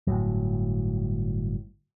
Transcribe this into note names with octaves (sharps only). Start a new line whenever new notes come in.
G1 C2 A2 F#3